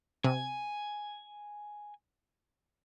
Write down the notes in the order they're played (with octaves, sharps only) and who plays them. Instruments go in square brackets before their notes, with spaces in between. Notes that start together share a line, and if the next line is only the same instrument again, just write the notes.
[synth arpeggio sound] C3 [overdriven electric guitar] G#5